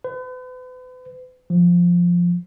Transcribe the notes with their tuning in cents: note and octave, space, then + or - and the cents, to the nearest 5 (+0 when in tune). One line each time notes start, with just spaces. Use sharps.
B4 +40
F3 +5